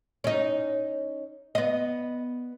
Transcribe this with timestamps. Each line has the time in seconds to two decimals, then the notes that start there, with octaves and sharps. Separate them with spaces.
0.24 C#4 D#4
1.55 B3 D#5